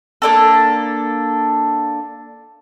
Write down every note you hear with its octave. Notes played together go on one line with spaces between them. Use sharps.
A#3 D4 A4